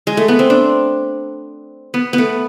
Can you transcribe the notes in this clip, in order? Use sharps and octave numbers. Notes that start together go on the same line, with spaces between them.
G#3
A3
B3
C4
D4
B3
B3
A3